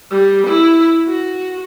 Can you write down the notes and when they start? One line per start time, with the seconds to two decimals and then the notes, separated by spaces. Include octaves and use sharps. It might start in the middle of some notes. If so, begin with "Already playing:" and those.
0.11 G3
0.47 E4
1.07 F#4